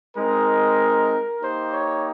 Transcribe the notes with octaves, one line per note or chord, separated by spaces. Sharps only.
G#3 C4 D#4 A#4
A#3 D#4 G4 C5
C#5